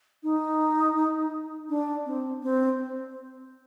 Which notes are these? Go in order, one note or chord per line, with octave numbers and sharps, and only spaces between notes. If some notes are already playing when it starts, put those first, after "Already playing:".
D#4
D4
C4
C4